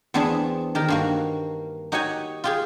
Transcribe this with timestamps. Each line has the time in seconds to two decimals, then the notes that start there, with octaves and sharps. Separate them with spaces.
0.14 E2 B3 C4 D4 G#4 E5
0.75 D#3 G4 A#4
0.88 G2 A#3 F#4
1.92 D#4 F#4 G4 C#5 F#5 G#5
2.44 F4 G4 G#4